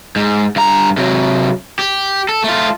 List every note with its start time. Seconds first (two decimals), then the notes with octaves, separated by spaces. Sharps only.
0.16 G#2
0.56 G2 A#5
0.97 C3 F#3
1.79 G4
2.29 A4
2.44 A3 F4